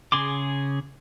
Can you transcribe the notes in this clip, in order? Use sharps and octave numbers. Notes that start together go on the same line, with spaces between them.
C#3 G#4 C6 D6